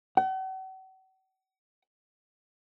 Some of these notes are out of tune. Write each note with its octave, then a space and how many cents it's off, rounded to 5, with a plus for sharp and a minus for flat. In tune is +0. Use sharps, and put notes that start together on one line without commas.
F#5 +45